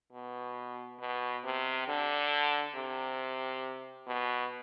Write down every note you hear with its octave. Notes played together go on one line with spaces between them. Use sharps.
B2
B2
C3
D3
C3
B2